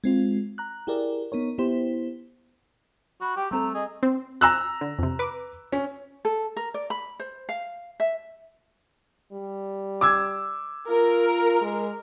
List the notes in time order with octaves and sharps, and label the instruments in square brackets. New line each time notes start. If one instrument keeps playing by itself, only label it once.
[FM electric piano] G#3 C4 F4
A#5 F#6
E4 G4 G#4 A#4 D5
B3 D#4 A#4 C#5
B3 E4 G4 C5
[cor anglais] F#4 [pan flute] B5
[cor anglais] G4 [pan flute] G5
[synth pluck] G3 C4 A4 [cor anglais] A3 [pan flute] A#5
[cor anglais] G#4 [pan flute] D#5
[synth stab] C4
[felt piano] A#5 E6 F#6
[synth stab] D3
F2 C3
B4 D6
[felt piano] C#4
[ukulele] A4
A#4
D5
B5
C5
F5
E5
[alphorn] G3
[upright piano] D6 E6 G#6
[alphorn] F4 [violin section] A#4
[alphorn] G#3